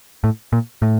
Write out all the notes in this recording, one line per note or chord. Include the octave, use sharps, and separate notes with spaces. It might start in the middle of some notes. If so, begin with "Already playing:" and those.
A2
A#2
A2